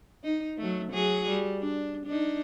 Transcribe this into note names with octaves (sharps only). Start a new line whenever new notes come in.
D#4
F#3 A3
F#3 F#4 G#4
G3
D4
D4 D#4